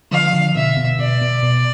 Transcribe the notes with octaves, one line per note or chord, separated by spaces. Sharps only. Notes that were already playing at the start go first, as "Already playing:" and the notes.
D3 F3 F5
D3 F3
B2 D3 E5
B2
B2 D5
B2
B2